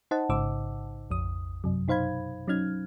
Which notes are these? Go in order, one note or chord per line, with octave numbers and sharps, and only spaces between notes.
D#4 C5 D#5 F#5 A5
A1 G#2 C#3 C5 D6 E6
A#1 F2 D#6
F#2 C3 F#3
B2 D#4 C5 F5 B5 G#6
F#3 C#4 D#4 F6 G#6